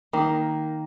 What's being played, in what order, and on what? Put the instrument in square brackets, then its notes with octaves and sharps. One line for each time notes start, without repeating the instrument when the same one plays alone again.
[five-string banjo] D#3 A#3